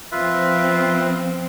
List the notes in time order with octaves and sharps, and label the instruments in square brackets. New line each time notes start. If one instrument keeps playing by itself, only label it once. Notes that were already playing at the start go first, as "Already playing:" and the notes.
[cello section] F3 C4 [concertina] F4 B4 E5